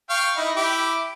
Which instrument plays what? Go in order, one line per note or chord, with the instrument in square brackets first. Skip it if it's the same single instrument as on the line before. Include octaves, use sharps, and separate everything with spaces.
[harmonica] F5 G5 C#6
D#4 E4
E4 G4 D6